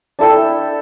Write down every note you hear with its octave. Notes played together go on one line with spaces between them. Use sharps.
D4 E4 A4 G5